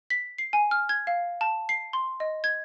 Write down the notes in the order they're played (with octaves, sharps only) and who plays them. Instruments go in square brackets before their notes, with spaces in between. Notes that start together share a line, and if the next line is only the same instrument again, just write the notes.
[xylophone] B6
C7
G#5
F6
G#6
F5
A5
C7
C6
D#5
G#6